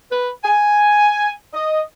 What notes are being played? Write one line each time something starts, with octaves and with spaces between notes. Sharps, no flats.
B4
G#5
D#5